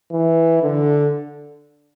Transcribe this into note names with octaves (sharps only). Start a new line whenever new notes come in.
E3
D3